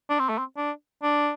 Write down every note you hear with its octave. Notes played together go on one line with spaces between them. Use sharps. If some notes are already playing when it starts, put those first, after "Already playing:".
D4
C4
A3
C4
D4
D4